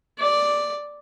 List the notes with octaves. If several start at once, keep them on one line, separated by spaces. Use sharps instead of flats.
D5